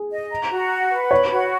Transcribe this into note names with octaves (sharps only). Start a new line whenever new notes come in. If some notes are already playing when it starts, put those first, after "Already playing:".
Already playing: G#4
D#5
A#5
F#4
F#5
B4
C#5 B5
F#4